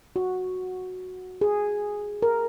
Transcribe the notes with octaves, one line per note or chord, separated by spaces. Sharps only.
F#4
G#4
A#4